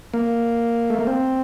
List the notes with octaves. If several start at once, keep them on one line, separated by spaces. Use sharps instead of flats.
A#3
A3
A#3
C4